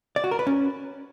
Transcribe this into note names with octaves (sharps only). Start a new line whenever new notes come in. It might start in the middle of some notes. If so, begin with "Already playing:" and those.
D5
F#4
A#4
B4
C#4